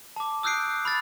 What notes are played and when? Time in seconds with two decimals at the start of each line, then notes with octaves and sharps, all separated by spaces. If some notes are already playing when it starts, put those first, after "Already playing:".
0.16 A5 D6
0.43 D#6 E6 F#6 G6 C7 D7
0.85 B5 F6 A6